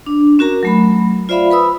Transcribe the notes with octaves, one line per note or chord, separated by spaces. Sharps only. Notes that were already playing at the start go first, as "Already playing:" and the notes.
D4
C#4 F#4 A#4 A#5
F#3 A3 B5
F4 C5 D5 E5 F5 B5
B4 B5 D#6 E6